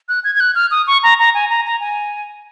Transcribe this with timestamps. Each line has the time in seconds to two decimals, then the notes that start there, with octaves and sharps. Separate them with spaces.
0.09 F#6
0.24 G#6
0.35 G#6
0.40 F#6
0.55 F6
0.71 D#6
0.87 C#6
1.03 A#5
1.19 A#5
1.34 G#5
1.50 A#5
1.65 A#5
1.80 G#5